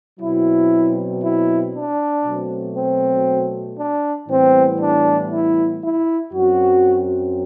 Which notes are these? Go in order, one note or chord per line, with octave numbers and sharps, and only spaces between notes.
B2 F#3 C4 E4
E4
D4
B2 F#3 A3 C4
C4
D4
A2 E3 G3 B3 C4
D4
E4
E4
F#2 F#3 C4 F#4